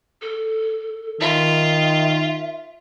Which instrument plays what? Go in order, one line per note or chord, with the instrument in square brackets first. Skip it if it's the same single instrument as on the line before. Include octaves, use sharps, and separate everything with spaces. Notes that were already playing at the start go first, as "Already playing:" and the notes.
[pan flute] A4
[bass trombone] D#3 [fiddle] F4 [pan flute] E5